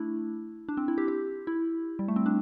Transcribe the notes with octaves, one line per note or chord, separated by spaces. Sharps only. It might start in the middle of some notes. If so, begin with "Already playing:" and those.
Already playing: A3 D4 E4
D4
C4
E4
G4
G4
E4
G3
A3
C4
D4